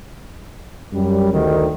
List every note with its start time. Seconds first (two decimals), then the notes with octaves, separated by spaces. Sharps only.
0.93 F#2 G3
1.33 D2 D#3